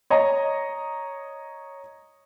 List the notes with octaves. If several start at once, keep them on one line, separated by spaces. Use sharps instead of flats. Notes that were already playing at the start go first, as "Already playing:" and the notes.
C#5 D#5 A#5